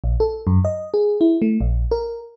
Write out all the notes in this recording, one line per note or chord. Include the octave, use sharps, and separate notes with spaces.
A#1
A4
F#2
D#5
G#4
E4
A3
A#1
A#4